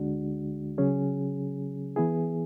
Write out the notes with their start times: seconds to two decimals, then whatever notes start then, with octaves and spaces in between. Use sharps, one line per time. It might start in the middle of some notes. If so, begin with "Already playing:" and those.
Already playing: D2 D3 G#3 D4 F#4
0.78 C#3 F#3 C#4 G#4
1.96 E3 B3 E4 G#4